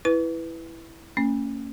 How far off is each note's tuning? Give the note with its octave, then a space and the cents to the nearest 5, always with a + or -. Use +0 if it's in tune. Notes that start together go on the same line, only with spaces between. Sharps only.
E4 +0 B4 +0
A#3 -40 C#4 +0